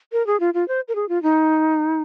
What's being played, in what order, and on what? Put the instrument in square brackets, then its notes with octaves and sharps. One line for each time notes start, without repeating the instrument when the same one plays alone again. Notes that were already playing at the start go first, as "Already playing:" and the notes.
[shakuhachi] A#4
G#4
F4
F4
C5
A#4
G#4
F4
D#4